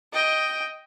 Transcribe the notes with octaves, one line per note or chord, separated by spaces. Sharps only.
D#5 G5